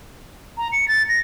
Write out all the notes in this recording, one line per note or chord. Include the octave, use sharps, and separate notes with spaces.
A#5
C#7
A6
A#6